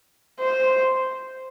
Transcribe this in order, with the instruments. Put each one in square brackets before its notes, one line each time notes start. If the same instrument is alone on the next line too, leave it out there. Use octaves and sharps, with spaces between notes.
[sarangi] C5